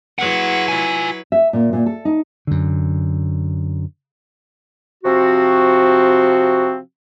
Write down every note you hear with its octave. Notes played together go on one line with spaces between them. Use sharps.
F#3 E4 G#4 B4 F#5
F4 G#5
E5
A#2
A#2
A4
D#4
F#2 D3
C3 F3 C4 F#4